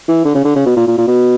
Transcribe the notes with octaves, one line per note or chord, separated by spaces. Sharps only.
E3
D3
C#3
D3
C#3
B2
A#2
A#2
A#2
B2